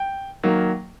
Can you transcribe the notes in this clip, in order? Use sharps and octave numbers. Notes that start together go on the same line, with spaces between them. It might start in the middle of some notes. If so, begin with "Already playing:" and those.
Already playing: G5
D#3 F#3 A#3